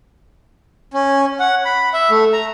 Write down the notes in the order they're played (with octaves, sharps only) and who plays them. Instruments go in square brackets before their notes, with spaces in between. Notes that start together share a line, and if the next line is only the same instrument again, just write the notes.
[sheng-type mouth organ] C#4
F#5
B5
E5
A3
A#5